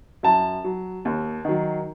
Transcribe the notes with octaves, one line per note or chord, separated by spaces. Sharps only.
F#2 A5
F#3
D#2
D#3 F#3